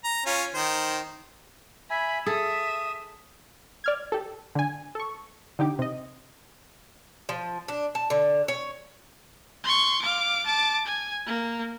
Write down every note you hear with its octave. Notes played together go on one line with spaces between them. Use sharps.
A#5
C#4 F4
D#3 C5
E5 G#5 B5
G#4 A4 E5 D#6
D5 F6 G#6
G4 A4
D3 G#5
A4 C#6
D3 D#4 G4 D6
C3 D#5
F3
D4
A5
D3
C#5
C6 C#6
F5 D6
A5 D6
G#5
A#3